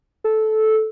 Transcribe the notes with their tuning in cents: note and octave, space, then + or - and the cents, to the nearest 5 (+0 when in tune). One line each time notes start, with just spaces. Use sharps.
A4 -10